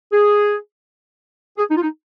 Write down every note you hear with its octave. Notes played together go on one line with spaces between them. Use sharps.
G#4
G#4
D#4
F4
D#4